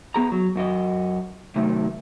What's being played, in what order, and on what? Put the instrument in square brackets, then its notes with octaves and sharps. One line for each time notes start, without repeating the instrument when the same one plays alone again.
[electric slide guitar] B3 G#4 A#5
F#3
F#2 F#4 D#5
C3 D#3 F#3 A3